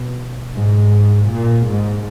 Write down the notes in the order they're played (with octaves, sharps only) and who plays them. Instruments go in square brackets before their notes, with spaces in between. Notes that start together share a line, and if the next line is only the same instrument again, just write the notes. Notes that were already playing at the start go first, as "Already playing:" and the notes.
Already playing: [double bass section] B2
G#2
A#2
G#2